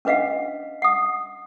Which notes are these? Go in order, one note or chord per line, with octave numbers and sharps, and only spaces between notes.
C#4 D4 B4 D#5 F5 F#5
F#5 D#6